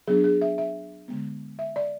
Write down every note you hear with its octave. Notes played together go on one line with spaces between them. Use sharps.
F#3 B3 D4 G#4
G#4
E5
E5
D3 G#3 B3
E5
D5